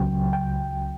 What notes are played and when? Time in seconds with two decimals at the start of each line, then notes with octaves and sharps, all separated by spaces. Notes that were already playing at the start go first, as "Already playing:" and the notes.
Already playing: C#2 C#3 F#3 G5
0.33 G5